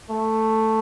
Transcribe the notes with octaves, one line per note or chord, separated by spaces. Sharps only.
A3